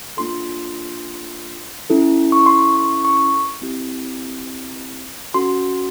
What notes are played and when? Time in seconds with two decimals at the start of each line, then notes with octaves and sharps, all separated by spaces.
0.17 A#3 D4 F4 A4 C6
1.90 C#4 E4 A4
2.32 C#6
2.46 C6
2.59 C#6
2.76 C#6
3.05 C#6
3.62 C4 E4 G4
5.34 C#4 F#4 A4 C6